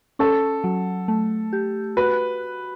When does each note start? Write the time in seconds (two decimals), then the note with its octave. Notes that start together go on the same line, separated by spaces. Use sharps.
0.19 C#4 A4
0.64 F#3
1.08 A3
1.53 G4
1.97 F#4 B4